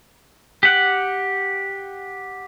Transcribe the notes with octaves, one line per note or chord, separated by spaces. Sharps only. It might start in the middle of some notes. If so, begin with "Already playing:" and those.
G4 F#5